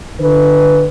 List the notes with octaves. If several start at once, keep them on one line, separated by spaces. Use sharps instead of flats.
D3 B4